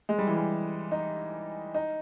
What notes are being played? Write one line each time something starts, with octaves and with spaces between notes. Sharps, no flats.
G#3
G3
E3
G3
D#4
D#4